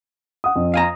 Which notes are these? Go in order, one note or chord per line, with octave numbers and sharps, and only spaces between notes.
F#5 D#6
F2
F5 G#5 A#5